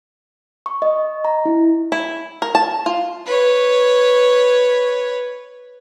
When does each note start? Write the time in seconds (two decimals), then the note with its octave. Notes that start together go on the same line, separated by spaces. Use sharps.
0.66 C#6
0.82 D#5
1.25 A#5
1.45 E4
1.92 E4
2.42 A#4
2.55 A5
2.86 F4
3.26 B4 C#5